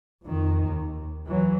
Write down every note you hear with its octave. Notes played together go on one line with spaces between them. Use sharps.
F2 D#3
D#2
E3 F#3